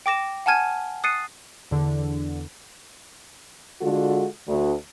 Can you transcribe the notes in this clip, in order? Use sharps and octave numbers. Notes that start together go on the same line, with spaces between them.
G5 D6 A#6 E7
F#5 G#5 A5 F6 G#6 D#7
D#6 F#6 A6 C7 C#7 D#7
E2 D3
D3 G#3 F4 F#4 A4
D2